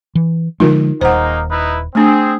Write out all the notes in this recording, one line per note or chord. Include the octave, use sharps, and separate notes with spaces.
E3
D3 F3 G#3 D#4 F4 A#4
D#1 G#3 A#3 D#4 C5 F#5
D#4 E4 B4
A3 C4 D4 G#4